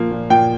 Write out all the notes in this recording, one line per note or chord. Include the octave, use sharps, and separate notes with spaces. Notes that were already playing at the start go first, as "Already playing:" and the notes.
Already playing: A#2 F3 A#3
A#2
A#2 G5